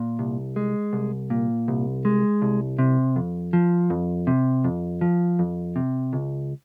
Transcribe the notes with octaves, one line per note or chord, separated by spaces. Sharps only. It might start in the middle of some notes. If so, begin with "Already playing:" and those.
Already playing: A#2
C2
G#3
C2
A#2
C2
G#3
C2
C3
F2
F3
F2
C3
F2
F3
F2
C3
C#2